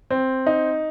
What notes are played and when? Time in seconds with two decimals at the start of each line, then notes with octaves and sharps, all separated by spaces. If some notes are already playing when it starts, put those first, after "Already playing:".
0.10 C4
0.46 D#4